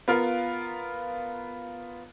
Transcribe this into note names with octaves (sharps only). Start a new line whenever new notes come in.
B3 F4 A#4 F5